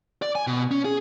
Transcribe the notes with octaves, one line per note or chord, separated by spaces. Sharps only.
D5
G#5
B2
C#4
G#4